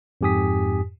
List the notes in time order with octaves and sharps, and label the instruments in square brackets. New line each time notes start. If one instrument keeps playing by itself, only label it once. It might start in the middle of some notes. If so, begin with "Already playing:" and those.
[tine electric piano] F2 G#2 G4 G#5 D#6 B6